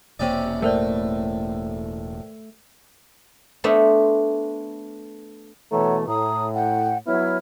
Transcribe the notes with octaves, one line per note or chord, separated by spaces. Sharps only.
E1 C3 A#3 C#4 D5
A2 A3 A#4 C5 D5
A3 B3 D4 C5 E5
B2 E3 A3 C#5 F#5 A#5
A2 A#5 D#6
F#5 G5
F#3 B3 E4 C#5 E5 F6